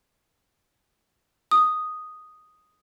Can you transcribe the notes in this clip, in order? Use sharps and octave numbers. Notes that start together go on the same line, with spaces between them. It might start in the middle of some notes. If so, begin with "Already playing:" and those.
D#6